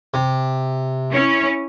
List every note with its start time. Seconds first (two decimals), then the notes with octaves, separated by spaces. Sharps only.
0.14 C3
1.10 C#4 E4 C#5